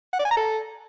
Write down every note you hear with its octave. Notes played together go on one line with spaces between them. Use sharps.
F#5
D5
G#5
A#5
A4